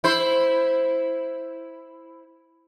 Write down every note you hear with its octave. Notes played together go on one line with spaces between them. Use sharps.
E4 C5